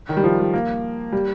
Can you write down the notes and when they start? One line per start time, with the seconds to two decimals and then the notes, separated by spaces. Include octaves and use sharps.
0.09 D#3
0.17 G3
0.24 F3
0.39 G3
0.54 A#3
1.12 G3